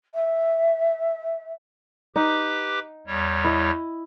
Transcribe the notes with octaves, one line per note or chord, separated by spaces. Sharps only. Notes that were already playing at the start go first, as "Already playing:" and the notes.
E5
D#4 G4 B4 F#5 D6
E2 G3 C#5
E4 D#5